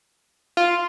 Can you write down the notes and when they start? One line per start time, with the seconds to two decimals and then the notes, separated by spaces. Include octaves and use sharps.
0.57 F4